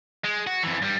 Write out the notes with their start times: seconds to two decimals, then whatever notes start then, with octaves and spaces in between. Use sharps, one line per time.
0.24 G#3
0.47 F#4
0.63 F2 E3
0.82 G2 G3